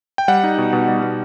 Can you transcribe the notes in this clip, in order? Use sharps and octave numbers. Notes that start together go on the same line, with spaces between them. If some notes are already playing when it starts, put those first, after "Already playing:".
G5
G3 F#5
D#4
B2
B2
G3
B2